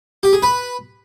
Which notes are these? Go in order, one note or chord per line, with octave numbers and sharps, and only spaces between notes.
G4
G#4
B4